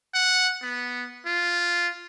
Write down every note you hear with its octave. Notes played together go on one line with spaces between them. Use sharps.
F#5
B3
F4